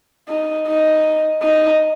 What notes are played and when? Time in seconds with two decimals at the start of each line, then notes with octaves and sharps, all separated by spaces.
0.29 D#4
0.67 D#4
1.42 D#4